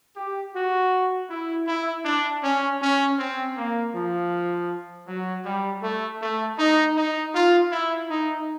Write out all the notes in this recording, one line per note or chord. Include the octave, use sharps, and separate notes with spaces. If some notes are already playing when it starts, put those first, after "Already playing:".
G4
F#4
E4
E4
D4
C#4
C#4
C4
A#3
F3
F#3
G3
A3
A3
D#4
D#4
F4
E4
D#4